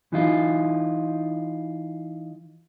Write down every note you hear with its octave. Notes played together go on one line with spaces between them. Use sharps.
E3 D#4 F4